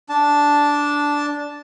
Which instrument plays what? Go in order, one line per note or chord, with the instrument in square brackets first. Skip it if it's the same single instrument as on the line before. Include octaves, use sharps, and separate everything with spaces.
[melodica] D4 A5